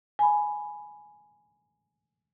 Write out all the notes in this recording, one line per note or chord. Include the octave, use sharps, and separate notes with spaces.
G#5 B5